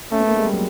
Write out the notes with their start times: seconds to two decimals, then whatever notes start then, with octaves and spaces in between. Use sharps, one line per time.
0.11 A3 C#4
0.20 B3
0.28 A#3
0.37 G#3
0.45 G3
0.54 F#3